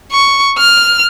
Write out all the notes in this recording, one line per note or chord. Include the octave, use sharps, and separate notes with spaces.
C#6
F6